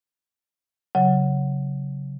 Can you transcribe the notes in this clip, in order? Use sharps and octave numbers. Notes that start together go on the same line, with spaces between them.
C#3 F#3